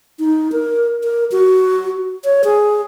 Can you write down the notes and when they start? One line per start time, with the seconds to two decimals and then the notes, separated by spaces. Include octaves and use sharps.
0.19 D#4
0.52 A#4
1.03 A#4
1.32 F#4
2.24 C#5
2.44 G#4